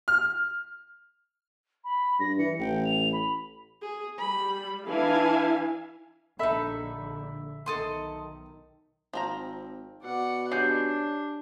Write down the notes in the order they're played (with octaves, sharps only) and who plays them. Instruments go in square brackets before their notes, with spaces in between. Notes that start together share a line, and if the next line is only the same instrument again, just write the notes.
[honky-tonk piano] F6
[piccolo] B5
[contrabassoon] G2 [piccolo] A#6
[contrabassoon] E3 [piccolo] C#7
[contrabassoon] A1 [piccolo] G5
[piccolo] F7
B5
[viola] G#4
[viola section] G3 [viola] B5
[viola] E3 D4 [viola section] E4 F5 G#5
[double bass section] A#1 A#2 D3 [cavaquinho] D#4 A4 [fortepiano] E5 B5
[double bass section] B1 D#3 [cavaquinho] A4 D#5 C6
[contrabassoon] G#1 [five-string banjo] F3 C4 A#5
[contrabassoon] B2 [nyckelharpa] D5 F#5
[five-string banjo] G#3 C#4 D5 [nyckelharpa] D4 [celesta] G4 G6 C7